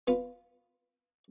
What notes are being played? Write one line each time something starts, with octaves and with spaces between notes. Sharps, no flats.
B3 F4